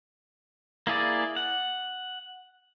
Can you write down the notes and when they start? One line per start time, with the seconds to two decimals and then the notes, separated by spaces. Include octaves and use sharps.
0.87 A#3 E4 G#4 D5
1.36 F#5